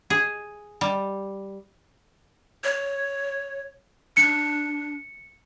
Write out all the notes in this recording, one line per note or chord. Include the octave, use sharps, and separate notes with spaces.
G#4
G3
C#5
D4 C#7